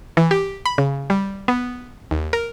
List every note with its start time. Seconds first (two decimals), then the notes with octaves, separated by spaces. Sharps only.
0.17 E3
0.31 G4
0.66 B5
0.78 C#3
1.10 G3
1.48 B3
2.11 D#2
2.33 A#4